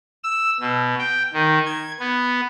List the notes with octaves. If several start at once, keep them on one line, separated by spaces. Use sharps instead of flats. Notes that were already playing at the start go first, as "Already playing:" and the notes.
E6
B2
G5
D#3
G#6
B3